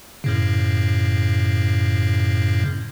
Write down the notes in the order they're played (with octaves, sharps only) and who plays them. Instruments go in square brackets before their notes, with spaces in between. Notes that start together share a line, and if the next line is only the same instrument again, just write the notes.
[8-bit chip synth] F#2 A2 C#3